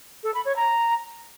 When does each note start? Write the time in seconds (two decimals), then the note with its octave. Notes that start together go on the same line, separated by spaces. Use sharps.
0.24 A4
0.34 B5
0.45 C#5
0.56 A#5